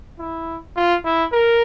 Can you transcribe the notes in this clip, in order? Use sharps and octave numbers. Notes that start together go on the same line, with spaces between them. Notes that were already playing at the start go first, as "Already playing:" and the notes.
E4
F4
E4
A#4